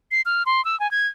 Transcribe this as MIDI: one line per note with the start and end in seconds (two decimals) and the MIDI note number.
0.11 0.21 96
0.26 0.43 89
0.46 0.64 84
0.65 0.78 88
0.80 0.90 80
0.91 1.07 92